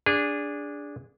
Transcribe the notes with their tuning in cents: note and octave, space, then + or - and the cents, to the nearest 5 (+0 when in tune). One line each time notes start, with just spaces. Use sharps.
D4 -10 G#4 -20